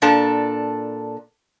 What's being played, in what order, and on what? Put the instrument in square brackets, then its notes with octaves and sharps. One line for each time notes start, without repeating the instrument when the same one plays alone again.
[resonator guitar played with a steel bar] A#2 D4 A4